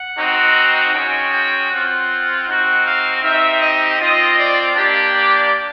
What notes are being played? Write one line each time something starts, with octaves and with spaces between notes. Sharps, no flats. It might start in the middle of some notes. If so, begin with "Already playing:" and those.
Already playing: F#5
C4 D#4 F#4
G#3 C#4 F#4 G5
G5
C4 F4 F#5
C4 D#4 F#4 F#5
F5
C4 D#4 G4 E5
D#5
C4 F4 D#5
D5
A#3 D4 G4
D5